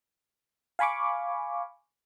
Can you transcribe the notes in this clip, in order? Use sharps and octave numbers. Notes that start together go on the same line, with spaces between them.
F5 G#5 B5 C#6 D6